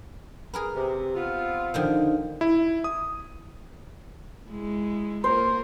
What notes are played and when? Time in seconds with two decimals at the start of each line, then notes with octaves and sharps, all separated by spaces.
0.54 G#4 A#4 B4
0.74 C3
1.14 B3 C4 F4
1.74 D3 D#3 F3
2.41 E4
2.84 D#6
4.50 G#3 E4
5.24 A#3 F4 A#4 C5